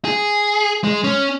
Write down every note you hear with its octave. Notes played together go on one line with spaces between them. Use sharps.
G#4
G#3
C#4